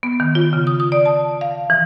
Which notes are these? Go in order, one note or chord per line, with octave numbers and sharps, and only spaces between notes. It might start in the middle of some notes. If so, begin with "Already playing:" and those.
B3
D#3
F4
C#3
D#6
D#6
D5
A5
F5
E3